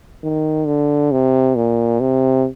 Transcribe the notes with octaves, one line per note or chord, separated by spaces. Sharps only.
D#3
D3
C3
A#2
C3